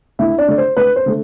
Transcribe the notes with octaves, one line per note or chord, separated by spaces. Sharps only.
D2 E4 E5
D4 D5
D3 A3 D5
C5
D2 B4
C5
D3 A3